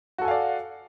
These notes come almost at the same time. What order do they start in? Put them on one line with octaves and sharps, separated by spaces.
F#4 A4 G#5 F5 D5